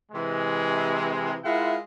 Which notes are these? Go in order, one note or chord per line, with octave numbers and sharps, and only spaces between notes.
C3 E3 G#3
G#3 E4 F4 A#4 E5 F#5